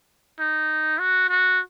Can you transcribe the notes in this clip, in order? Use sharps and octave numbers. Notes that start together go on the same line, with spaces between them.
D#4
F#4
F#4